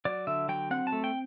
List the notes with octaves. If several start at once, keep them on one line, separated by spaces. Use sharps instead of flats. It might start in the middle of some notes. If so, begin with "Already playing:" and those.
F#3 D5
D3 E5
F#3 G5
C4 F#5
A5
A3
G5